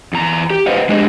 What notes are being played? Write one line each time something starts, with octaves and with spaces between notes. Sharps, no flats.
E2 A#5
G4
B4 C5 D#5 F5 F#5
G#3 D4 G4 G#4 C#5 D#5